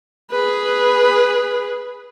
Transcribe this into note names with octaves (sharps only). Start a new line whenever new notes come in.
G#4 B4